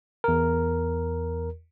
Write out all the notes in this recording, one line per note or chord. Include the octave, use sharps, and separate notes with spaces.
E2 A#4